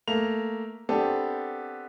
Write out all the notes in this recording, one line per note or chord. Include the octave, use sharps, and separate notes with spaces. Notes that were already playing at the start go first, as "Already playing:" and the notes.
A3 A#3 F7
B3 C4 D4 G4 A4